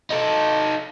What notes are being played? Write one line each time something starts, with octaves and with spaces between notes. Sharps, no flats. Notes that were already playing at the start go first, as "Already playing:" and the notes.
D#4 A4